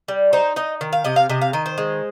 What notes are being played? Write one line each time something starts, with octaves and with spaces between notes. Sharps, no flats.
G3
D#4 C5
D#4 D#5
D#3
F5
C3 D#5
F5
C3 D#5
F5
D#3 D#5
C5
G#3